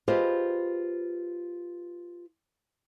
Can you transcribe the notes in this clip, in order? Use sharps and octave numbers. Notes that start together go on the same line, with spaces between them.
F4 G4 G#4 B4 C5 D#5